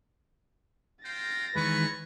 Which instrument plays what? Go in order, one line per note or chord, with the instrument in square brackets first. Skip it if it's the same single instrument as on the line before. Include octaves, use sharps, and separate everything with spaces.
[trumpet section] C5 F5 G5 [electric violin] A6 A#6
[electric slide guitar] D#3 E3 G#3 [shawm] B4 [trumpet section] C#5 E5 C#6